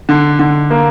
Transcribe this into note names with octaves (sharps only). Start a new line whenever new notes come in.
D3
D3
A#3